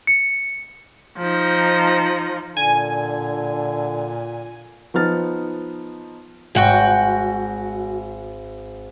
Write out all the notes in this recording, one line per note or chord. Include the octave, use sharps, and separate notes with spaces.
C#7
F3 D#4
A#2 D3 G#5
F3 B3 D#4 F6 A6
G#1 F#4 F#5 G5